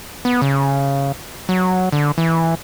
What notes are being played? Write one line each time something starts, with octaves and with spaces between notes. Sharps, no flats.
B3
C#3
F#3
D3
E3